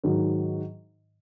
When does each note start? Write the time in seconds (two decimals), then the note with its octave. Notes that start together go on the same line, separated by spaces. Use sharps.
0.04 G#2 D#3 F#3